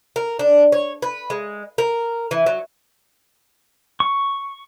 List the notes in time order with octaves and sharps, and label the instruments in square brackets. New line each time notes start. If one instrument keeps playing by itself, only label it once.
[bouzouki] A#4
D4
C#5
B4
G#3
A#4
E3
F#3
[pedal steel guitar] C#6